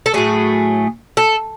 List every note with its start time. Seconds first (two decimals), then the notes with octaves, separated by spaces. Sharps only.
0.06 A4
0.14 A2 F#3 A3 G#4
1.17 A4